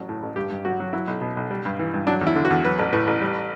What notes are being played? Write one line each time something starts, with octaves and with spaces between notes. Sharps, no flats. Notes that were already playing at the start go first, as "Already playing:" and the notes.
Already playing: A1 F#3
A2
A1
G2 G4
G2
F#3 F#4
F#3
F#3 E4
B1
B2
B1
G3
G2
E3
G2
F#3 D4
E2
E4
D3
F#4
E2
F#3 B4
A1
A2 B4
A1
G3